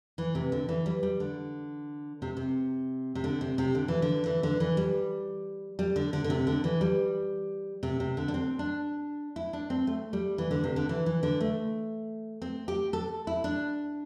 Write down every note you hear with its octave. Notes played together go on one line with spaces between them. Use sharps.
E3
C3
D3
E3
G3
G3
D3
C3
C3
C3
D3
C3
C3
D3
E3
D3
E3
D3
E3
G3
G3
D3
D3
D3
C3
D3
E3
G3
C3
C3
D3
D4
C4
D4
E4
D4
C4
A3
G3
E3
D3
C3
D3
E3
E3
D3
A3
C4
G4
A4
E4
D4